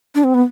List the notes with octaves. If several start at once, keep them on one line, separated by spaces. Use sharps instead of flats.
D4
C4
B3